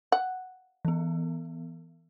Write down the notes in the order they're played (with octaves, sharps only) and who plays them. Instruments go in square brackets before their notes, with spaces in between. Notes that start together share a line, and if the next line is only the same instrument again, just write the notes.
[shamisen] F#5
[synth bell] E3 B3